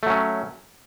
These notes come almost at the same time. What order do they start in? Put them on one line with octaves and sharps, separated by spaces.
A3 F#3 C#4